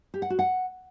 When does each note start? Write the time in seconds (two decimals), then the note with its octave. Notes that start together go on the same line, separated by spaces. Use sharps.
0.14 G4
0.22 F#5
0.30 F#4
0.39 F#5